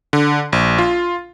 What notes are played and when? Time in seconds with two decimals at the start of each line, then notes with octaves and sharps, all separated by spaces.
0.13 D3
0.53 A#1
0.78 F4